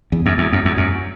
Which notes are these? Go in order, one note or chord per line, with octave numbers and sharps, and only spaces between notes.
E2
F#2
E2
F#2
E2
F#2